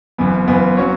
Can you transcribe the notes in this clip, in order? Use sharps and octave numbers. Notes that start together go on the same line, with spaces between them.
F#1 F#2 E3 B3
F#1 F#2 E3 B3
F#3 C#4 F#4 C#5